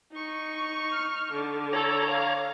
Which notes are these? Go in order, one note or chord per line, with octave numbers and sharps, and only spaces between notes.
D#4 C#6
F6
D3
A4 C#5 A#5
F5